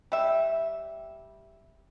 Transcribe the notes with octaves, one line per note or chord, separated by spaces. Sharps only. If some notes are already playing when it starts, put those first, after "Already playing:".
G3 E5